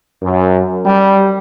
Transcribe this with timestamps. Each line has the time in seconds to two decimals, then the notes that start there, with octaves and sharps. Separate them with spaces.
0.23 F#2
0.86 G3